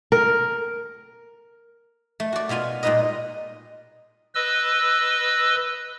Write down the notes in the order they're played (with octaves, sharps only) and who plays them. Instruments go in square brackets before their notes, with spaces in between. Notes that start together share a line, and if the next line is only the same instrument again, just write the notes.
[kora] A#4
[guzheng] A3
F#4 D5
B2 B3 F4 G#5
A#2 G3 G#3 D#4 B4 D#5
[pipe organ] B4 D#5 E6